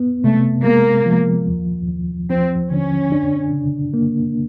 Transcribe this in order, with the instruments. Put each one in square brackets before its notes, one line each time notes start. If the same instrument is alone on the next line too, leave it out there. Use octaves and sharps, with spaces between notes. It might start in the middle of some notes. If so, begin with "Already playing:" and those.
Already playing: [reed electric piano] B3
[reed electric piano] C3 [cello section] A3
[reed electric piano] G#3 [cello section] A#3
[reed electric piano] F3
D#2
D#2
[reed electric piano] F3 [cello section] C4
[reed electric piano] D3 [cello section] C#4
[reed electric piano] D4
C#3
A#3